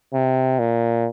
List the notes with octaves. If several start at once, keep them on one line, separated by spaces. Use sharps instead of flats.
C3
A#2